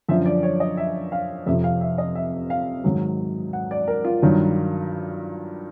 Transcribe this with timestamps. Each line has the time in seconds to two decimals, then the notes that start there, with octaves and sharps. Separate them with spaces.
0.09 F#2 D3 F3 E5
0.26 D5
0.43 C#5
0.60 D#5
0.77 E5
1.12 F5
1.46 F2 C3 F3 E5
1.64 F5
1.81 E5
1.98 D#5
2.15 E5
2.50 F5
2.84 G#2 D#3 F#3
3.53 F#5
3.71 D5
3.88 A#4
4.04 F4
4.22 G2 D#3 F#3